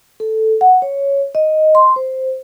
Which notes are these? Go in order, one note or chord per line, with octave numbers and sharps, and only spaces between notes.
A4
F#5
C#5
D#5
C6
C5